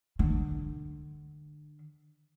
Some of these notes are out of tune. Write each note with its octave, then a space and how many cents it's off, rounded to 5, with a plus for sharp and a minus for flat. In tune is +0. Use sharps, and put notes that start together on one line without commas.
D3 +30